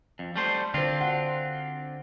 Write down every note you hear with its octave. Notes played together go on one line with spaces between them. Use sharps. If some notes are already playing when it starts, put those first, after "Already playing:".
F2
G3 A3 C5
D3 C4 D4 F4 C5
F#5